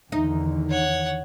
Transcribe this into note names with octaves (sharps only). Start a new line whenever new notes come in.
E2 D3 D#3 D#4
C#5 F#5